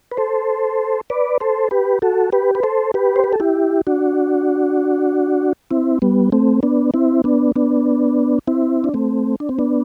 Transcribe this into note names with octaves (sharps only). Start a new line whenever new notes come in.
B4
A4 C5
B4 D5
A4 C5
G4 B4
F#4 A4
G4 B4
B4
A4 C5
G4 B4
C5
B4
A4
E4 G4
D4 F#4
C4 E4
G3 B3
A3 C4
B3 D4
C4 E4
B3 D4
B3 D4
C4 E4
D4
A3 C4
D4
C4
B3 D4